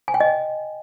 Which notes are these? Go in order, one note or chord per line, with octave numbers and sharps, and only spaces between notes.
G#5
G5
D#5